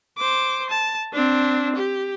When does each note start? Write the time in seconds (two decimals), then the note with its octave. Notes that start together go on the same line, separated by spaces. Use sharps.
0.18 C5 D6
0.70 A5
1.13 C4 D4
1.75 G4